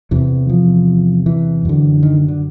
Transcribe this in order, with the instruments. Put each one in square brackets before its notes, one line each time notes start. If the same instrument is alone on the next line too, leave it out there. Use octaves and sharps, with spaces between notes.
[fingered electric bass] E2 C3 E3
F3
E3
F#2 D3
D#3
D3